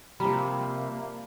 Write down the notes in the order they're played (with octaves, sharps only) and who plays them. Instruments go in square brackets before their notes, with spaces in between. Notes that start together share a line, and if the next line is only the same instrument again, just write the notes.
[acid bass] C3 [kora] F3 G3 [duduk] A#3 [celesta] A#5 B5